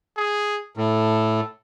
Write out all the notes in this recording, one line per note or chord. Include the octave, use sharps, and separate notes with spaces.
G#4
A2 A4